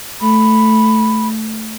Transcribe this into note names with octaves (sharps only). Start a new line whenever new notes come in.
A3 B5